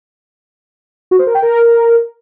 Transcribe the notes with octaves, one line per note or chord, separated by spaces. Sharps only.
F#4
C5
A#4
G5
A#4